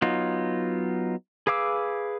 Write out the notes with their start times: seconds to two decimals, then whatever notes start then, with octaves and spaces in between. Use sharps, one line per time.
0.02 F#3 B3 D#4 F4
1.47 G#4 B4 F5 D6 E6